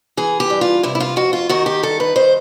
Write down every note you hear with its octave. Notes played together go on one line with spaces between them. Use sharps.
E3 G#4
G4
G2
F4
C3 E4
E4
F4
F2 F#4
F4
D#3 F#4
G4
G2 A4
B4
D#3 C5